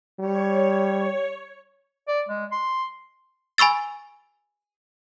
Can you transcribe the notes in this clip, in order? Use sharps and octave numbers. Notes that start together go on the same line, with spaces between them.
G3 C#5
D5
G#3
C6
G#5 B5 C#6 E6 A6